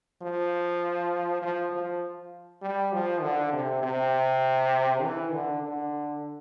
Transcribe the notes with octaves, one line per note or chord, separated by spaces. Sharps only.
F3
F3
F3
G3
F3
D3
C3
C3
E3
D3
D3